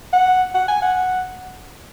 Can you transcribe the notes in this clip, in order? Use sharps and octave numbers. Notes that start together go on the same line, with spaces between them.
F#5
F#5
G#5
F#5